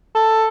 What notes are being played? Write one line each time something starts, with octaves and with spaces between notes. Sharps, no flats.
A4